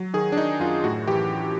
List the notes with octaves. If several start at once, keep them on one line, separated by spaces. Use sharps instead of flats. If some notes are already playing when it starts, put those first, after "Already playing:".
Already playing: F#3
D#3 G#4
D4
D#3 D#4
F#2 F4
A2 F#4
E3 G4